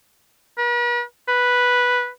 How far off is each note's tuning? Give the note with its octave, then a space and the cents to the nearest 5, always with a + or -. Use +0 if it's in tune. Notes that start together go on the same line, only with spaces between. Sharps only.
B4 -45
B4 -5